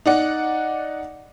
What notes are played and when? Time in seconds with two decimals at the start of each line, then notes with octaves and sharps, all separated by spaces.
0.06 D#4 D5 F#5